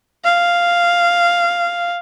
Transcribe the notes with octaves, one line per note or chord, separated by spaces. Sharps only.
F5